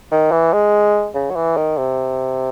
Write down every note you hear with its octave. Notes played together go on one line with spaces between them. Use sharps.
D#3
E3
G#3
C#3
F#3
E3
D#3
C3